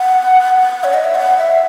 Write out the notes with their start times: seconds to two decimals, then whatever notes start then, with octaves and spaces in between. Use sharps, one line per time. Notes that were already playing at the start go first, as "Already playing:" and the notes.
Already playing: F#5
0.84 C#5
0.94 D#5
1.04 E5
1.15 F#5
1.37 E5